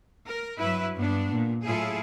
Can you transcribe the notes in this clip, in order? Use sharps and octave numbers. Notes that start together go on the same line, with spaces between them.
A#4
G2 F#3 E4 B4 E5
G2 B3 D4
A#2
A2 F#3 E4 F4 G#4 A4